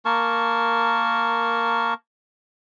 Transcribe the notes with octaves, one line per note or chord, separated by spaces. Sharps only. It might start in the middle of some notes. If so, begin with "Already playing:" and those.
A#3 A#4 A5 C#6